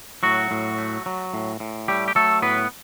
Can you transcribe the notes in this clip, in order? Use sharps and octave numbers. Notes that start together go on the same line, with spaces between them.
A2 F#3 F#4
A2
A3
F#3
A2
A2
G3 A3 G4
G4
F#3 A3 A4
A2 B3 B4